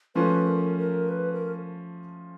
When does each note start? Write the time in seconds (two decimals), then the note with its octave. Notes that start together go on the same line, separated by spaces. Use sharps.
0.15 F3 A3 C#4 B4
0.47 A#4
0.78 A#4
1.09 B4
1.33 A#4